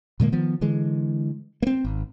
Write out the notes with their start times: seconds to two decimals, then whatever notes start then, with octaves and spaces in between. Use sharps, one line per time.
0.20 A#2 D3 G#3 A#3
0.32 D#3 F3 B3
0.61 D3 E3 G#3
1.62 A#3 C4
1.85 G#1